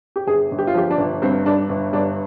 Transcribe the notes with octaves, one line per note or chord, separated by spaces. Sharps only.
G4
G1 G#4
G1
G4
F4
F3 G4
D4
G1
G2 C4
G2 D4
G1
G2 D4